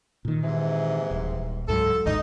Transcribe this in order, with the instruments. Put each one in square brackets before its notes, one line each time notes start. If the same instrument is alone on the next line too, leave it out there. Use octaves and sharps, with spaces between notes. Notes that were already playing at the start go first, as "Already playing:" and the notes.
[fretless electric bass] A#2 D#3
[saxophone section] G#2 C3 E3
[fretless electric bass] D#1
[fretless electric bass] C#2 G#2 F#3 [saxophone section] A4
[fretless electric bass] G1 D2 G#2 [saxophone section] D#4